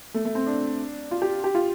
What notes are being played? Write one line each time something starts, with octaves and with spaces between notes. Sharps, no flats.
A3
A3
C4
D4
F4
G4
G4
F4